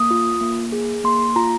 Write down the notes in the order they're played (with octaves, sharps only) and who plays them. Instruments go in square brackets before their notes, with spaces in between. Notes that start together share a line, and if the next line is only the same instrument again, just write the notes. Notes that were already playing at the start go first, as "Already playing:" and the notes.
Already playing: [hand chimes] A#3 D#6
F4
A#3
G#4
A#3 C6
F4 A#5